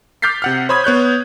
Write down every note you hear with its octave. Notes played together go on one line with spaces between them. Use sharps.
D6 F6 G6 A6 B6 C7
C3 F#5 F6
C5 C#5 B5 D#6 G#6
B3 C#5 F#6 G6